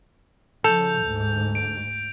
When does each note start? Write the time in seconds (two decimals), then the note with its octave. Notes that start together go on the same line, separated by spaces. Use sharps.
0.64 C#3 F3 A4 G6 F7
1.05 D2 G#2
1.55 D7